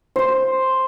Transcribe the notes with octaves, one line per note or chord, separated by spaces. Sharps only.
C5 C6